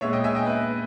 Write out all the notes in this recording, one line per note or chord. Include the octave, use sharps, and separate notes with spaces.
A#2 G#3 B3 C#5 E5
D#5 G5
E5 G#5
D#5 G5
B4